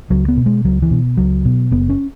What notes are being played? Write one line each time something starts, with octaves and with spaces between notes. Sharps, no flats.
C#2 F#3
B3
B2
G#3
C#2 F#3
E3
B2
C#2 F#3
B2
F#1 B3
C#4